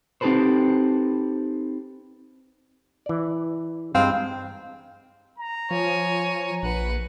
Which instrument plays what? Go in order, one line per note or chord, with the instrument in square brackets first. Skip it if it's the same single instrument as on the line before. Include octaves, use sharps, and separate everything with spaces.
[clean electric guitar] C4 D#4 G4 A4 B4 C5
[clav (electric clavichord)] E3 D5
[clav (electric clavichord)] G2 G#3 D#4 [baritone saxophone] C4 [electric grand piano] F5
[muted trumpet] A#5
[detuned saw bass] F3 [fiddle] C#5 G#5
[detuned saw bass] A#1 [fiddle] B4 F#5